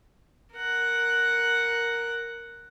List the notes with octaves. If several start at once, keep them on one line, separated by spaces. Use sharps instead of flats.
A#4 F#5